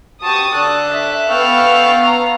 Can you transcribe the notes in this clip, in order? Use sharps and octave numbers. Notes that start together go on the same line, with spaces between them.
F#4 G4 A5 C#6 D#6
D3 D4 A4 F#6
E5
B3 F5 G5 C#6 E6 F6
A#5